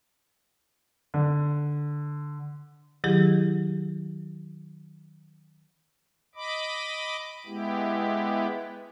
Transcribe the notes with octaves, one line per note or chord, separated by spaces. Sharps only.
D3
D#3 F#3 E4 G4 G#4
D#5 B5 D6
G#3 B3 E4 G4